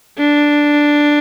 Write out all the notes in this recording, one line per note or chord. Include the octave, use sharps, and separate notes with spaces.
D4